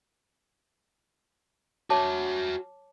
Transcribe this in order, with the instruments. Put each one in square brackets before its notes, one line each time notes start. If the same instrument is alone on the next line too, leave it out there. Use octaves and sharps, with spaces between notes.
[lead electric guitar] F#4 E5 [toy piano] C#5 A5 D6